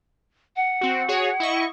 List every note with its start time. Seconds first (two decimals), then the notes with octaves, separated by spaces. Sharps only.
0.56 F#5
0.81 C4 F#4
1.08 F#4 G#4 C#5
1.40 E4 D#5 C#6